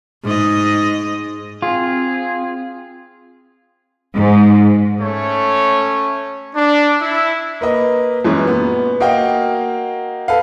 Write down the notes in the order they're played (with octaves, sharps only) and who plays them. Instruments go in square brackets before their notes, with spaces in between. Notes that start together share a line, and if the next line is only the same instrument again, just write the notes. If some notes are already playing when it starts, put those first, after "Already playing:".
[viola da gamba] G#2 D#5
[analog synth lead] C4 [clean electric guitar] F4 [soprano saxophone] G#4
[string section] G#2
[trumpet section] A3 C#4 C#5
D4
E4
[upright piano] A#3 B4 D#5
F#2 E3 G#3 C#4
A#2 B3
A#3 F#4 A#4 D#5 F5 G5
A4 B4 F5